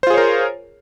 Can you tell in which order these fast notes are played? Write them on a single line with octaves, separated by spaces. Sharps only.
C5 F4 G#4 C#5 A#4